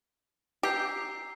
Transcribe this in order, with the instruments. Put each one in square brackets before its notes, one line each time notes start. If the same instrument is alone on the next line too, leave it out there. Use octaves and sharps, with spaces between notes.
[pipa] G4 [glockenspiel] A#5 E6 G6 C7